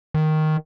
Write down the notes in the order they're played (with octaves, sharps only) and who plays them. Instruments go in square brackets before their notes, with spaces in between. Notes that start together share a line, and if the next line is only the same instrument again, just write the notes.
[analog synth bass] D#3